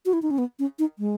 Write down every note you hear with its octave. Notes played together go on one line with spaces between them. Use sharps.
F#4
E4
D#4
C#4
B3
C#4
D#4
G#3